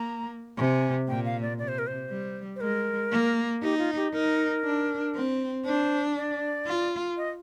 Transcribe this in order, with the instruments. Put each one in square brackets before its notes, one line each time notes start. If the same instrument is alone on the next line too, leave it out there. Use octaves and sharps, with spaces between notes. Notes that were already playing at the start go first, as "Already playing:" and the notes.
Already playing: [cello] A#3 [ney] A#5
[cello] C3 [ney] G#5
[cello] A#2 [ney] G5
[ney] F5
D5
[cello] C3 [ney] D5
[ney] C5
A#4
C5
[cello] G3
[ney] C5
[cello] G#3 [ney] A#4
[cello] A#3
[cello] D#4 [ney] G4
[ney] F4
G4
[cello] D#4 [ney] A#4
[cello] D4
C4
[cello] D4 [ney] C5
[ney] D5
[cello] F4
[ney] D#5